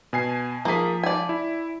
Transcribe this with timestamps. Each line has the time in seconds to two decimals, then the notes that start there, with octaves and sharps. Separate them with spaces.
0.13 B2 G#5 C7
0.65 F3 A#3 G#4 B6
1.03 D5 G#5
1.29 E4